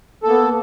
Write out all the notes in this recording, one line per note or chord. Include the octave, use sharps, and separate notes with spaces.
A#3 B3 A4